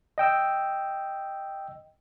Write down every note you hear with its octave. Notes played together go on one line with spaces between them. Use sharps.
D#5 G5 E6